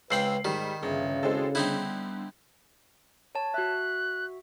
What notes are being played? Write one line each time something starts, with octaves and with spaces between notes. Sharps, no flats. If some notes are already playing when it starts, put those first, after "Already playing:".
C#2 C4 B4 G5 E6 C7 F#7
G#2 D#3 G3
G1 C#3 G#4 E5 F5
G#3 C4 E4 F#4 A4
D3 G3 B3 C4 D#4 E4
C#5 A5
F#4 E5 F#6